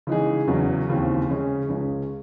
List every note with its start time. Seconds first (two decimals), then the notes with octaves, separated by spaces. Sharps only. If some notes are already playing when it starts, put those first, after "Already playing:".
0.07 C#3 E3 G#3 D#4 G#4
0.47 E2 C#3 F#3 C#4
0.89 D#2 C#3 E3 C4
1.29 C#3 G#3 C#4 G#4
1.69 C#2 C#3 G#3 C#4